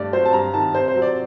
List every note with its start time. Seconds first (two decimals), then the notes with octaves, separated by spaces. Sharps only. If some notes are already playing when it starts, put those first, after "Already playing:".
Already playing: G2 A3 D5
0.13 F#3 C5
0.25 A5
0.33 G2 A#5
0.54 D#3 A5
0.75 C3 C5
0.88 C5
0.95 F#3
1.02 D5